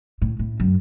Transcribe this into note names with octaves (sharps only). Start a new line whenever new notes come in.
A2
A2
F#2